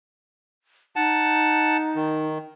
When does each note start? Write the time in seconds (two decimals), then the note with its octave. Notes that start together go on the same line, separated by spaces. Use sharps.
0.96 D#4 F#5 A5
1.95 D#3